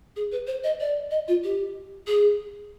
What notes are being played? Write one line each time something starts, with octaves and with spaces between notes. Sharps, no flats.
G#4
B4
C5
D#5
D5
D#5
F4
G4
G#4